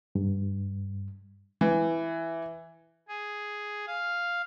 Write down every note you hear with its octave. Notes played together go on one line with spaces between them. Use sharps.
G2
E3
G#4
F5